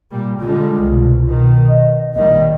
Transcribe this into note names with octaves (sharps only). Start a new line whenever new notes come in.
A#2 G3
D3 G3 G#3 F4
C2 B2
B2 D#3
D#5
A#1 D#3 G3 D#5